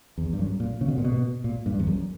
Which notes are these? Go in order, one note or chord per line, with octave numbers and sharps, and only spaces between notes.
E2
G2
F#2
A#2
C#3
B2
A#2
B2
A#2
G2
E2
F#2